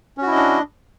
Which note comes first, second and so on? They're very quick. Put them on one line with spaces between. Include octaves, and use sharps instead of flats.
C#4 F#4 E4 D#5 D4